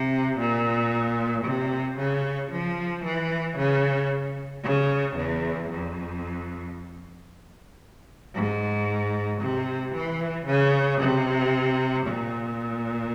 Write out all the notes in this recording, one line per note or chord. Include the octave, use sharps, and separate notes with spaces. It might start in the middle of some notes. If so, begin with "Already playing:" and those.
Already playing: C3
A#2
C3
C#3
F3
E3
C#3
C#3
E2
F2
G#2
C3
E3
C#3
C3
A#2